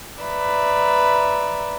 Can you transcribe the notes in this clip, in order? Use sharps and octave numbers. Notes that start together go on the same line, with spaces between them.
B4 D5 E5 A#5